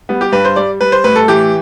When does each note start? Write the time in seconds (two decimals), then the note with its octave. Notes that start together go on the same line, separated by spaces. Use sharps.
0.09 G3 B3
0.21 G4
0.32 G2 B4
0.45 C5
0.56 G3 D5
0.81 G3 B4
0.92 C5
1.04 A2 B4
1.16 A4
1.28 E3 G4